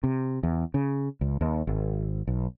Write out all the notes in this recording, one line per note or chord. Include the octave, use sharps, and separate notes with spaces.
C3
E2
C#3
C#2
D#2
G#1
B1